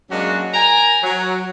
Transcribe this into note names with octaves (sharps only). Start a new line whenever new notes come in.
F#3 G#3 A#3 C#4 D4 F#4
A#4 G5 G#5 A#5
F#3